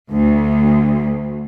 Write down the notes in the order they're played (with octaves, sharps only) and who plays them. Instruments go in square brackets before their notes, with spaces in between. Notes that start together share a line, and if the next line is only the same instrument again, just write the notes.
[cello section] D2